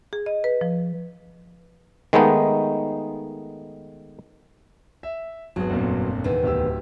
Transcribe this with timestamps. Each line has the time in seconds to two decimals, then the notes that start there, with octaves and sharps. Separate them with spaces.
0.13 G#4
0.26 D#5
0.44 B4
0.61 F3
2.13 D#3 G#3 A3 B3 D#4
5.03 E5
5.56 G#1 F#3 B3 G#4
5.70 G1 F2 A#2
6.24 E2 C3 D#3
6.44 D1 G4 E6